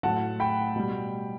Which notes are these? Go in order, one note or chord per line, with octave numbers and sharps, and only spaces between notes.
A2 F#3 F#5 A5
G5 B5
B2 G3